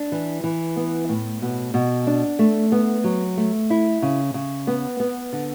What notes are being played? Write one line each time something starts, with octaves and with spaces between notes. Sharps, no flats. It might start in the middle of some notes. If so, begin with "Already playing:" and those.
Already playing: D4
E3
E3
B3
A2
B2
B2
D4
A3
B3
F#3
A3
E4
C#3
C#3
B3
B3
D3